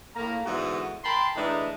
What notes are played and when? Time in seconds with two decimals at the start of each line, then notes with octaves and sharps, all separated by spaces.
0.16 A2 A#3 A#5
0.46 G#2 D3 E3 B3 F#4
1.04 A#4 G5 A5 B5 C6
1.36 E3 G#3 A3 D4 D#4